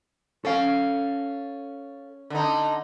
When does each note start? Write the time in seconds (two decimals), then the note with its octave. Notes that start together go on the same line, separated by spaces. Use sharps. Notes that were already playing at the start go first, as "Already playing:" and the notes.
0.45 C#4 A4 F5
2.30 D3 D#4